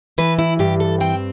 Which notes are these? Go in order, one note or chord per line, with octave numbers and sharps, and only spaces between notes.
E3 B4
E4
G2 G4
A4
C4 G5